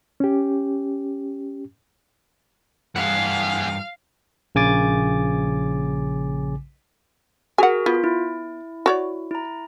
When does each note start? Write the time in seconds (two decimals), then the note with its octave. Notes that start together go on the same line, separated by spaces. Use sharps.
0.20 C#4 G4
2.96 G2 E3 G#4 F5 F#5
4.55 A#1 C#3 G#5 D6 A6
7.58 F#4 G#4 A#4 F#5 G#5
7.86 B3 F4
8.04 E4
8.86 F#4 C#5 D5
9.31 E4 A#5